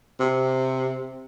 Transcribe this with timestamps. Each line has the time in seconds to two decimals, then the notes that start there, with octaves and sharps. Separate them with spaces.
0.19 C3